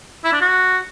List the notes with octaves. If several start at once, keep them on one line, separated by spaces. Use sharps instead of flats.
E4
D4
F#4